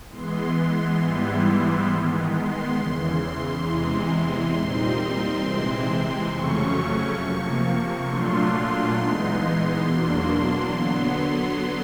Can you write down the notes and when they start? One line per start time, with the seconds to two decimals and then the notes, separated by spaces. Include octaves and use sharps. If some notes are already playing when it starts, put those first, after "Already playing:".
0.10 E3 G#3 B3 C6
0.98 G#2 E3 G3 B3 E4
1.88 D#3 G#3 B3
2.32 C6
2.76 E2 C#3 E3
3.64 E2 C3 E3 G#3
4.52 A#2 G3 C4 D#4 C6
5.40 C3 E3 G#3 C4
6.29 F2 C#3 F#3 A3 C#4 C#6
7.17 C3 F3 A#3
8.05 A#2 F#3 A3 D4 F4 C6
8.94 E3 G#3 B3 D#4
9.82 E2 B2 F#3 A#3 D4
10.70 D3 F#3 B3